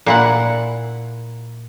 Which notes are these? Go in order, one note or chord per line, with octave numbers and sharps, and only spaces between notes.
A#2 E4 F#5